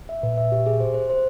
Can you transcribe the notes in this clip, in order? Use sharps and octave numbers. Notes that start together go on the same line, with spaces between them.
E5
A#2 B4
E5
G4
G#4
C5
C5
C5